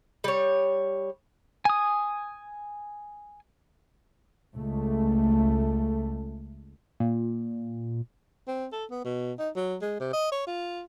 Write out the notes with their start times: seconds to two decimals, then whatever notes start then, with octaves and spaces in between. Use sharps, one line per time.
0.24 G3 C#5
1.65 G#5 D#6
4.53 C#2 A3
7.00 A#2
8.47 C4
8.72 A4
8.90 B3
9.04 B2
9.39 D#4
9.55 F#3
9.82 G#3
10.00 C3
10.13 D#5
10.32 C#5
10.47 F4